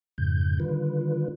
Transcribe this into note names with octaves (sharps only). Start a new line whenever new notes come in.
F2 G#2 C#3 G6
D3 D#3 G3 F4 B4